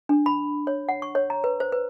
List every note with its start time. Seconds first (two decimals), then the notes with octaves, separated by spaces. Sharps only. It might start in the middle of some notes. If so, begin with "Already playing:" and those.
0.09 D4
0.26 B5
0.67 C#5
0.89 F#5
1.02 C#6
1.15 C#5
1.30 A#5
1.44 B4
1.60 C5
1.72 B4